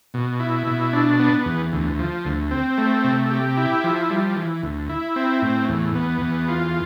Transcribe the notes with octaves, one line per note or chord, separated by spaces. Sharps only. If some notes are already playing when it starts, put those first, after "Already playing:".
B2
E4
B2
D4
B3
E2
D2
F3
D2
C4
A3
C3
G4
E4
F3
G3
E3
D2
E4
C4
A2
E2
B3
E2
F4